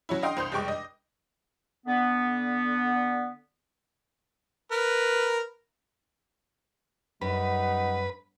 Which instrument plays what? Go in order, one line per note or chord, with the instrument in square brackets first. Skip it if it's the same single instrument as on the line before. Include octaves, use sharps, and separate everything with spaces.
[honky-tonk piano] F#3 C#4 E4
D#5 F5 G5 C6 D#6
C2 C5 C6 G6
F1 G3 G#3 G5 C#6 D6
D#5
[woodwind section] D3 B3
[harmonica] A#4 B4
[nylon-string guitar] F#2 [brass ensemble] G3 D#4 F#5 [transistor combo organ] B4